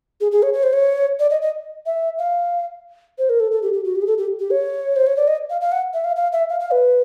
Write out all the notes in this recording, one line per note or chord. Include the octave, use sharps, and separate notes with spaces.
G#4
G#4
C#5
C#5
C5
C#5
D5
D#5
D#5
E5
F5
C5
A#4
A4
A4
G4
G4
F#4
G4
G#4
A4
G4
G4
C#5
C5
C#5
D5
D#5
F5
F5
F#5
E5
F5
F5
E5
F5
F5
B4